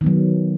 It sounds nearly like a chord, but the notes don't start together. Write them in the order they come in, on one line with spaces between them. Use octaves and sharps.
D#3 B3 F#3